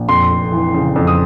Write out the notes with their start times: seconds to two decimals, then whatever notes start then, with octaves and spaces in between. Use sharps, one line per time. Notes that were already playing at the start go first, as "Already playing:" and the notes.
Already playing: A#1
0.08 F2 C6
0.30 F1
0.52 E3
0.74 C#3
0.96 F2
1.07 D#6